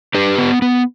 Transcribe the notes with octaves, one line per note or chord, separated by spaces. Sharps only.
D4 G4 B4
B3
B3